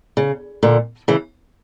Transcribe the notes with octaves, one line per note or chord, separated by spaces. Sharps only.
C#3
A#2 D3
C#3 E3